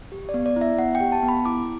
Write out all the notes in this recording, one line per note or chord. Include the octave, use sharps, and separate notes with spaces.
G4
D5
B3
D5
E4
E5
B3 F#5
G5
G4
A5
B3
B5
E4 D6